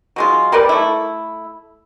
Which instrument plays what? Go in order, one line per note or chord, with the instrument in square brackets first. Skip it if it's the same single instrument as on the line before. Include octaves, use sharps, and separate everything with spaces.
[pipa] F#3 G#3 F4
G3 A#4 B4 D5
A3 E4